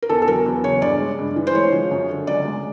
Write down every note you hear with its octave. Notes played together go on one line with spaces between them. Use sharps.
A#4
E2 A4
A4
F#3 A#4
E2
C#3 C#5
G2 D5
G#3
G2
E3
C5
G#3 C#5
F3
F#2
D3
C#2 D5
G#3